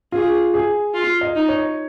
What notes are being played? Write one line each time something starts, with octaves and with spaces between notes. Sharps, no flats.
F4 G#4
G#4
F4
D#5
D#4
C#5